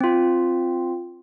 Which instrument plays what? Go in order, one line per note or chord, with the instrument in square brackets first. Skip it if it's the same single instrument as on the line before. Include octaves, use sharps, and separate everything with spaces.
[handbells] C4 F4